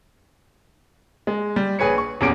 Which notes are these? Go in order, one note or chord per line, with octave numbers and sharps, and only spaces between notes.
G#3
G3
A#1 G#4 B4 C#5 C#7
C#6
D#1 E2 C#4 G#4 D6 D7